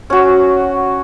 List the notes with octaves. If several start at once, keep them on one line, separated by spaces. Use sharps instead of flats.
C#4 F#4